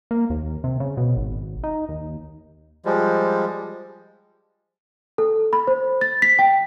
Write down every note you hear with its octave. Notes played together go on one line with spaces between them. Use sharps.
A#3
D#2
C3
C#3
B2
G#1
D#4
D#2
F3 G3 G#3
A4
B5
C5
A6
B6
G5